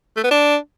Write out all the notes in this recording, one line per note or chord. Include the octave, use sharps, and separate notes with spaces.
A3
B3
D4